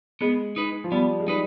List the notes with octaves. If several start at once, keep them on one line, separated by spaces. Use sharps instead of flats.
G#3 B3
D#4 B4
F3
G3 B3
G#3
G3 D#4 B4